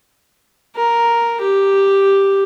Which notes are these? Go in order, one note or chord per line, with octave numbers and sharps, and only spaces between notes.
A#4
G4